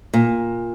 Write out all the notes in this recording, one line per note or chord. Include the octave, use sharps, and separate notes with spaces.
A#2